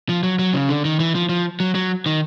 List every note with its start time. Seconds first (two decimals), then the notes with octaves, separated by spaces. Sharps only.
0.09 F3
0.23 F#3
0.39 F#3
0.54 C#3
0.69 D3
0.85 D#3
1.00 E3
1.15 F3
1.29 F3
1.60 F#3
1.75 F#3
2.06 D#3